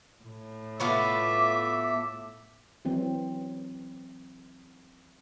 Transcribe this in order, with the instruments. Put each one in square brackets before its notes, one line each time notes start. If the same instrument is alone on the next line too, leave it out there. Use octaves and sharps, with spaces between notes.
[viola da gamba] A2
[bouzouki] A3 B3 F4 [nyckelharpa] E5 [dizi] D6
[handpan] E3 F#3 C4